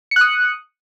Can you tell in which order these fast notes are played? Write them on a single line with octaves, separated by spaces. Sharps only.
C#7 F#6 D#6